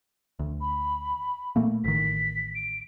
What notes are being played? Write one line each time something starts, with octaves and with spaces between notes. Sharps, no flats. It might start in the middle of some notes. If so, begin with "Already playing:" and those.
D2
B5
A#2 A3 A#3
A1 D#3 B6
D7